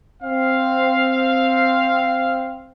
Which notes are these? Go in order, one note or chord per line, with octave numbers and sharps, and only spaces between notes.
C4 F5